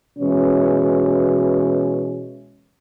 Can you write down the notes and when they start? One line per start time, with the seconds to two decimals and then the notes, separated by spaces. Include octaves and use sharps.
0.19 B2 E3 G#3 C#4